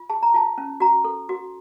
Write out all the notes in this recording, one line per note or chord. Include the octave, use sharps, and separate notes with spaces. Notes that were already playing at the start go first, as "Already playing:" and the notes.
Already playing: F4
G#4 A5
A#5
F4 A5
C#4
F#4 A#5
A4
F#4